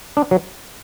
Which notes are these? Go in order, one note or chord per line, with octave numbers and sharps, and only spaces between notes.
D4
F#3